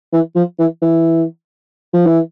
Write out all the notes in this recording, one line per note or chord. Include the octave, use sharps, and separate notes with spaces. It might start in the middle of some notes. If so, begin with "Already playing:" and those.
E3
F3
E3
E3
F3
E3